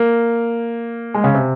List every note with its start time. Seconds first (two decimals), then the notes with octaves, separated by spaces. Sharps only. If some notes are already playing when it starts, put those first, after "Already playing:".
Already playing: A#3
1.14 G#3
1.24 C#3
1.35 C3